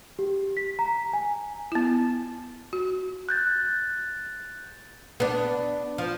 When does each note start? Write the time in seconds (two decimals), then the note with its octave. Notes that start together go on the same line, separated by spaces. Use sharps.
0.19 G4
0.57 B6
0.79 A#5
1.13 G#5
1.72 B3 E4
2.73 F#4
3.29 F#6 G6 A6
5.20 B3 D4
5.98 F3